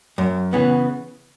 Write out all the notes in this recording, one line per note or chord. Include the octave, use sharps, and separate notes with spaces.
F#2
C#3 E3 B3